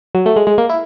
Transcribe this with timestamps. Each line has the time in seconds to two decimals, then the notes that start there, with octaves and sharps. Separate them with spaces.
0.15 F#3
0.26 A3
0.36 G#3
0.47 G#3
0.58 A#3
0.69 E4